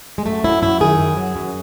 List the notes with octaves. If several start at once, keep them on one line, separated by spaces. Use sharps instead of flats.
G#3
F#2 A3
F#3 E4
F#2 E4
D#3 G#4
F#2
F#3
F#2